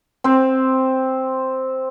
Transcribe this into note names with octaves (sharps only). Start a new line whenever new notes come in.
C4 C5